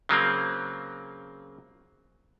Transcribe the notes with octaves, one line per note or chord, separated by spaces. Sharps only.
C#3 F#3 A#3 C4